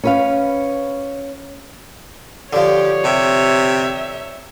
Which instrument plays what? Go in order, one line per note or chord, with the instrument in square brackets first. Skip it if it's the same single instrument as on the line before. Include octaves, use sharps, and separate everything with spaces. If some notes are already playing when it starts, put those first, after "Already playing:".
[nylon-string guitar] C#4 B4 F5
[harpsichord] D3 F3 [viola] G4 [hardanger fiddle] C#5
[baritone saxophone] C3 [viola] E5